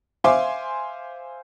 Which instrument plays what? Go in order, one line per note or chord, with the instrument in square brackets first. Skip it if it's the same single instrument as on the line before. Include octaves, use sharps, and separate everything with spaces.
[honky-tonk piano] C5 E5 F5 G#5 C6 D6